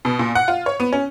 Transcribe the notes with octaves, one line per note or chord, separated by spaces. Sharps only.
B2
A#2
F#5
F4
C#5
B3
C#4